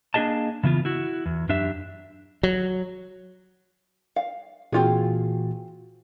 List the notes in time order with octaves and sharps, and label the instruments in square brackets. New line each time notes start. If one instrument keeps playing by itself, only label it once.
[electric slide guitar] A#3 D4 D#4 G#4 D#5 A5
C#3 E3 B3 F4
E4 F#4
E2
F#2 D4 G4 E5
[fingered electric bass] F#3
[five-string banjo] F5
[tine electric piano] A#2 E3 F#4 [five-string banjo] C4 F4 G#4